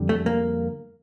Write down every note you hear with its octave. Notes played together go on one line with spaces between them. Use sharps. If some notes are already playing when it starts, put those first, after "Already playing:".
Already playing: F2 D3 G3
A3
A#3